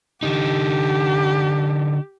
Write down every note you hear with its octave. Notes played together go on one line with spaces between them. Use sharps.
D3 D#4 G4